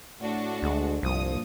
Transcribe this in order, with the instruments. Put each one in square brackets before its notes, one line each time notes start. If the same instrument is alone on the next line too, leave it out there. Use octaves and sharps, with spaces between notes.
[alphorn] A2 [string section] A3 D4 F#4
[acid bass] D2 [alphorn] G#3
[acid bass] C2 [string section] G2 A#2 D#6 [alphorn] F3